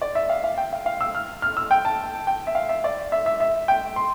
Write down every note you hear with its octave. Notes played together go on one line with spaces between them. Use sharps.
D5
E5
F5
F5
G5
F5
F5
E6
F6
F6
E6
G5
A5
G5
E5
F5
E5
D5
E5
E5
E5
G5
C6